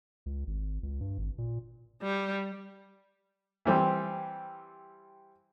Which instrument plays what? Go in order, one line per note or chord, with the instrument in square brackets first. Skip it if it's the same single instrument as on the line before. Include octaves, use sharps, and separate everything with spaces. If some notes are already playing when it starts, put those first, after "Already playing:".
[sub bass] C#2
G#1
C#2
G2
G#1
A#2
[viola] G3
[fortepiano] E3 G3 C4